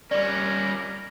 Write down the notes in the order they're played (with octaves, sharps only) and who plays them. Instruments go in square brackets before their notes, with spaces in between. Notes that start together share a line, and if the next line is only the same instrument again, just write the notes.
[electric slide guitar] G3 C#4 [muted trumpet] A#4 [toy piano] D5